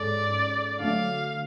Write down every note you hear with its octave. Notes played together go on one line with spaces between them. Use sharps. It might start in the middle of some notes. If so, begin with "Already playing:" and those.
Already playing: G#2 G#3 C#4 A4 D5
D3 F#3 A3 F5